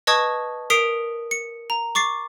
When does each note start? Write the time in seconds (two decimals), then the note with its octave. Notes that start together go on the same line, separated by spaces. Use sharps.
0.07 B4 D#5 A5 C#6 D#6 G#6
0.70 A#4 D#6 B6 C7 D7 F7
1.31 C#7
1.70 A#5
1.95 C#6 D6 A6 C7